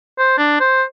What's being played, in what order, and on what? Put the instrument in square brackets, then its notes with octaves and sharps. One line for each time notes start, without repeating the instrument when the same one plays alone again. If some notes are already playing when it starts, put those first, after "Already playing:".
[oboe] C5
D4
C5